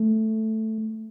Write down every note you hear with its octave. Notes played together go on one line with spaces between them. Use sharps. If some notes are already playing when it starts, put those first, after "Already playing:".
Already playing: A3